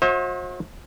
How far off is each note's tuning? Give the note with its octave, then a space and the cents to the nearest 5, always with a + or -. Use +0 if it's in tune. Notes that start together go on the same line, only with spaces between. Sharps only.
F#4 -40 C5 +40 E5 -45